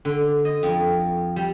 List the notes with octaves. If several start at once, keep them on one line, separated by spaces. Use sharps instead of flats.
D3
D#5
F2
G3